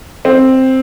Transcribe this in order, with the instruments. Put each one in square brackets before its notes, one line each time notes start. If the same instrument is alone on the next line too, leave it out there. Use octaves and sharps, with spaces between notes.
[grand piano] C4